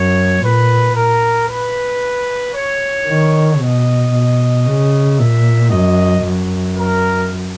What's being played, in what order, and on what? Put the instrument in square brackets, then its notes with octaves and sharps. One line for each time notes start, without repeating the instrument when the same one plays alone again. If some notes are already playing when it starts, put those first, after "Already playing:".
Already playing: [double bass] F#2 [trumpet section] C#5
[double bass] A#2 [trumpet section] B4
[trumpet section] A#4
B4
C#5
[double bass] D#3
[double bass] B2 [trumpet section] D#5
[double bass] B2
C#3
[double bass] A#2 [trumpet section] E5
[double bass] F#2 [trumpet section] D#5
[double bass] F#2
[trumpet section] A#4